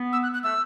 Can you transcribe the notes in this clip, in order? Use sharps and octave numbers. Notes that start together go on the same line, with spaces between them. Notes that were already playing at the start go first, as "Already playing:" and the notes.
Already playing: B3
E6
F#6
F#6
A3 E6